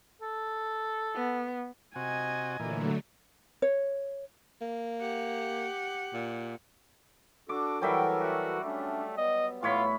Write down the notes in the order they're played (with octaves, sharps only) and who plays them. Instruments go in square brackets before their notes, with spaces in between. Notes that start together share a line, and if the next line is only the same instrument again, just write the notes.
[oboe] A4
[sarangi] B3
[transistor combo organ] C3 F#4 [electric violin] D#5 G#5
[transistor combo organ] A#2 E3 [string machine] D3 F#3 A3
[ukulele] C#5
[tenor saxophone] A#3
[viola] G4 F#5
[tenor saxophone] A#2
[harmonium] D4 F#4 A4 [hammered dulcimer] D6
[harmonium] E3 A4 A#4 [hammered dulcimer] F#3 G3 E5 [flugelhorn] G5
[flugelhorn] F#4
[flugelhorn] A3 [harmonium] C#4 D4
[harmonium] B3 [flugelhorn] D#5
[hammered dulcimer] A2 C#5 B5 [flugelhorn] F4